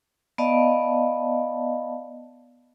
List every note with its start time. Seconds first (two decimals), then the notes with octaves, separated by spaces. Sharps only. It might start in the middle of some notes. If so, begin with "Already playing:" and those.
0.38 B3 D5 D#5 F5 A5